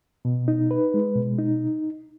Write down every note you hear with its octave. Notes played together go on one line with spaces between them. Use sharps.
B2
D#4
B4
G#3
B2
D#4